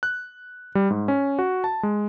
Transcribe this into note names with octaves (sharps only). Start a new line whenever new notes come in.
F#6
G3
G#2
C#4
F#4
A5
G#3